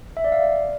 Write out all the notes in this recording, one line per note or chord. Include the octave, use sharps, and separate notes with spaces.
E5
D5
F5